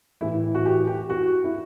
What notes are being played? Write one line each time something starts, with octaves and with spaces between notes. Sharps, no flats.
A2 E3 E4
F#4
G4
G4
F#4
E4